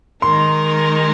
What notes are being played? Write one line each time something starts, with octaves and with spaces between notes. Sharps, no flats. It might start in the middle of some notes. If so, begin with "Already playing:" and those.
D#3 G#3 D#4 A#4 C6